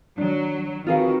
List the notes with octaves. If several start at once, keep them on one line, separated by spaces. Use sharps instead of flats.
D#3 F#3 D4
D#3 C4 F4 F#4 G#4 A#4 B4 F5